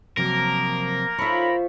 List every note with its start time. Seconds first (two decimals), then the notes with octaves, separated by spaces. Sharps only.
0.17 C3 F3 F#3 A#3 A#4
1.18 F3 D#4 A4 C#5 E5 B5 C#6